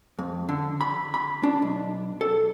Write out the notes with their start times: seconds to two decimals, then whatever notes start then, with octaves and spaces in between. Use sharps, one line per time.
0.19 F2
0.49 D3
0.81 B5
1.14 B5
1.43 D4
1.62 B1
2.21 A4